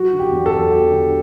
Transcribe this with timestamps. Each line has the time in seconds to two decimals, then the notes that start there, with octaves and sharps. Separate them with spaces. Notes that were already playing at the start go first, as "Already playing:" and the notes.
Already playing: F#3 F#4
0.13 D3
0.19 G4
0.32 E2
0.46 A4
0.51 E2
0.71 F#3 G4
0.90 D3